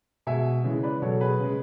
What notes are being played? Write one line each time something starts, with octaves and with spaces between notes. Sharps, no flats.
B2 G#3 E5 G#5
C#3 E3 G#3
B4 D5
B2 F#3 A4 C#5
G#4 B4
C#3 G#3